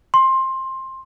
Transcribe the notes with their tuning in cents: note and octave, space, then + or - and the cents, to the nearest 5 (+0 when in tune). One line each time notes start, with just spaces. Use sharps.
C6 +15